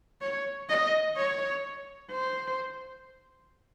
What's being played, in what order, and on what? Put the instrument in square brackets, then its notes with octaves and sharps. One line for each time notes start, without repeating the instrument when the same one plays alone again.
[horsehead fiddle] C#5
D#5
C#5
C5